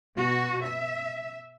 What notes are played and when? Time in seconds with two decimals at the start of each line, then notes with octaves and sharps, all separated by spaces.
0.16 B2 F#4
0.64 E5